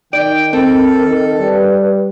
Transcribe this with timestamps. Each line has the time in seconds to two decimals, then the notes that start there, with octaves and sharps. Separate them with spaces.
0.13 D#3 D#4 D5 G5
0.53 C4 A4 A#4
0.98 D#3
1.40 G3 B4